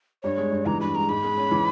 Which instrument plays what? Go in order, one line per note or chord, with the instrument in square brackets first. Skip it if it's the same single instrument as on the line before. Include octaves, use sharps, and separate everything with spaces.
[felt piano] G2 [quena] C#5
[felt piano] G#3
G2
[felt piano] E3 [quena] A#5
[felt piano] G2 [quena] B5
[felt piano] G#3 [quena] A#5
[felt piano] G#2 [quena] B5
[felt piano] G#3
C#4
E3